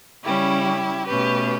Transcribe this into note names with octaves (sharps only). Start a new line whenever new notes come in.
C#3 G3 C#4 E4 G4
B2 A3 C#4 G4 B4